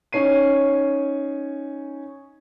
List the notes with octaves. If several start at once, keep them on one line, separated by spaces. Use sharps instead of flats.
C#4 D#4 C#5 C7 D#7